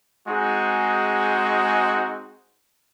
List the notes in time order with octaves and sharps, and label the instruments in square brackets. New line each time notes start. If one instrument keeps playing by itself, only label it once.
[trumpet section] G#3 C4 D#4 F#4 G#4